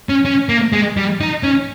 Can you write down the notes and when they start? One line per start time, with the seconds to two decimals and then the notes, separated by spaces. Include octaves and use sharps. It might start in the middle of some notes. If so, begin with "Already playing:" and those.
0.09 C#4
0.26 C#4
0.49 A#3
0.73 G#3
0.97 G3
1.20 D#4
1.43 C#4